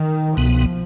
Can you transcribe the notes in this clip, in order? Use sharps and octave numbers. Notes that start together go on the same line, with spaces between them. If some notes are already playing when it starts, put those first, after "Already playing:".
Already playing: D#3
C2 B2 F3 B3